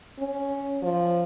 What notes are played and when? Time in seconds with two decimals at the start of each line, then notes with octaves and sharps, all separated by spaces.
0.19 C#4
0.82 F3